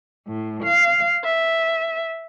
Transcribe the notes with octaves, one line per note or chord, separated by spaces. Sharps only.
A2
F5
E5